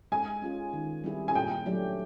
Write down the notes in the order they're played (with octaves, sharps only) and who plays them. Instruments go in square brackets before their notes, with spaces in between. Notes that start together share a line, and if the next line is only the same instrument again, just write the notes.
[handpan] G#3 [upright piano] G#5
[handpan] C#4 F4 G#4
D#3
G3 C4 E4 G#4
[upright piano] G#5
[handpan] A#2 [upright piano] G5
[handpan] F#3 A3 D4 G4